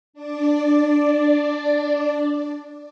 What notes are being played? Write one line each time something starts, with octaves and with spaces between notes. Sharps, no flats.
D4 D5